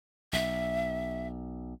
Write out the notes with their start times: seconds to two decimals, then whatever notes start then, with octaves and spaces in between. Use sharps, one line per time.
0.33 B1 E5